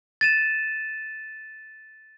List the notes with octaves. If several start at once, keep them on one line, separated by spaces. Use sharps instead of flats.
A6 D#7 E7